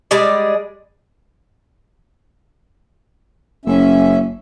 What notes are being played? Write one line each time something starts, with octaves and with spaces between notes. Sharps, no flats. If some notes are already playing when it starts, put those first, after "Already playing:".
G3 G#3 G#4 D5
F#1 C#4 E5